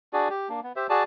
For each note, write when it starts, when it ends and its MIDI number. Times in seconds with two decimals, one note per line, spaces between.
0.13 0.28 62
0.13 0.28 66
0.13 0.28 68
0.13 0.28 74
0.30 0.49 67
0.49 0.60 58
0.49 0.60 62
0.64 0.72 59
0.76 0.87 67
0.76 0.87 72
0.76 0.87 76
0.90 1.03 66
0.90 1.03 68
0.90 1.03 74
0.90 1.03 81